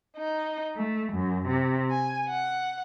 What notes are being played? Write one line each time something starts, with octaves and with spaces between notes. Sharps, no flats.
D#4
A3
F#2
C3
G#5
F#5